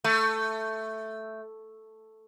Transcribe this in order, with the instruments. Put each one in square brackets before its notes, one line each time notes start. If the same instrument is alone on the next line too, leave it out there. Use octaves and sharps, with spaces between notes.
[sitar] A3